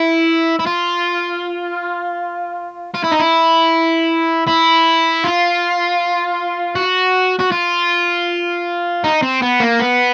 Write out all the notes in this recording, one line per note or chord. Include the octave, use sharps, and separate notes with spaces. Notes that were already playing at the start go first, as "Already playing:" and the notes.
Already playing: E4
E4
F4
F4
E4
D#4
E4
E4
F4
F#4
F#4
F4
D#4
C4
B3
A#3
B3